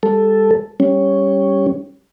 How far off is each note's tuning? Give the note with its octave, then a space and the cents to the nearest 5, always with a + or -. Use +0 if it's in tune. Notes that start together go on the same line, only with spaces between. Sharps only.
G3 +30 A4 +0
G3 +0 C#4 +0